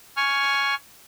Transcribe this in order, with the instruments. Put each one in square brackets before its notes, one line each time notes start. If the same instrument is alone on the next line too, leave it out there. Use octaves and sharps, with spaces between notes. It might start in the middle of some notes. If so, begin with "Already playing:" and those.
[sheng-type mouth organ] G#5 C#6 F6